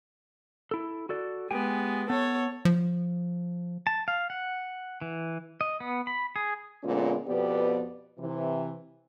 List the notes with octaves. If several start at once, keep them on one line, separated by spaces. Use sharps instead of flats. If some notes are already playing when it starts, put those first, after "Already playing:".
E4 A4
F#4 A4 D5
G#3 B3 G4 G5 G#5
B3 A4 C#5
F3
A5
F5
F#5
E3
D#5
B3
B5
G#4
A#2 D3 G#3 B3 C#4 F4
F2 B2 B3 G4 B4 D5
C3 E3